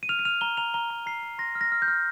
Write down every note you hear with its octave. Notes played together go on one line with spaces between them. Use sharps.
D#7
F6 F7
D#7
F6 F7
A#5 G7
A#5 F7
A#5 G7
A#5
A#5 C7
A#5
C6 A#6
F6
A#6
F6
G6
F6